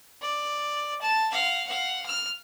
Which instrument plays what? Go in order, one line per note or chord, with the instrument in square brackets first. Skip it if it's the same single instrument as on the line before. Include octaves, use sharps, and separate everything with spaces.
[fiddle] D5
A5
F5 F#5
F5 F#5
F6